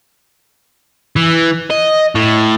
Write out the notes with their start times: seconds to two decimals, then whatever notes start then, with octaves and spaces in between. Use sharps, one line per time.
1.16 E3
1.70 D#5
2.15 A2